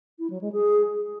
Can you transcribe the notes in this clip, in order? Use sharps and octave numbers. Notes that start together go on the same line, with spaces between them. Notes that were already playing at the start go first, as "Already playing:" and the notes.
E4
F#3
G#3
G#4